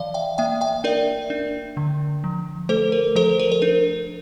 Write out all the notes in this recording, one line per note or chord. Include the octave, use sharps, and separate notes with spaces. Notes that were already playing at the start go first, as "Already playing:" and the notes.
Already playing: E3 D5 F5
E5 G5
A#3 E5 G5
E5 G5
D4 A#4 D5
D4
D3
F3
A3 A4 C5
A#4
F3 A4 C5
A#4
C5
D4 A#4